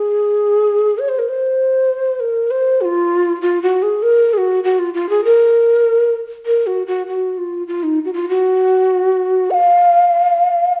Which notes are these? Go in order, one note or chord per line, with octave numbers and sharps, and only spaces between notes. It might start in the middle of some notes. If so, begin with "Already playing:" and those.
Already playing: G#4
C#5
C5
A#4
C5
A#4
C5
F#4
F4
F4
F#4
G#4
A#4
G#4
F#4
F#4
F4
F4
G#4
A#4
A#4
F#4
F#4
F#4
F4
F4
D#4
F#4
F4
F#4
F#5
F5